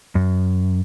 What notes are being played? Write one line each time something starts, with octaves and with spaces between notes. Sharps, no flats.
F#2